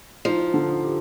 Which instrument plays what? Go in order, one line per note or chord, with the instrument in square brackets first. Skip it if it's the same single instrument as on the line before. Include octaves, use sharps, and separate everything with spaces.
[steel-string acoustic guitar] F3 [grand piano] D#4
[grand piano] D3
G4